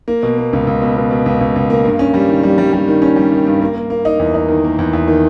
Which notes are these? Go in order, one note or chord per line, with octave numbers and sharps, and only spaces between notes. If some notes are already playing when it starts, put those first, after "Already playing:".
A#3
B2
A#3
C#2
C#2
B2
B2
B2
C#2
C#2
C#2
A#3
G2
C#4
G3
D#3
G3
G3
G3
D#3
C#4
G3
D#3
G2
A#3
A#3
A#3
D#4
E2
D#4
D#3
A#3
E2
E2
D#3